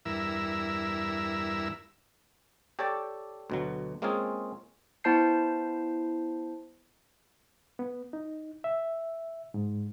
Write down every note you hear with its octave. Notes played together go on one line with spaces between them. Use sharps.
E2 G2 E4 A#4 E6
G4 A4 C#5 D5 G5 A5
D2 B2 F#3
G#3 A#3 C4 C#4 F4 G#4
B3 E4 C5 A5 G6 C7
B3
D#4
E5
G#2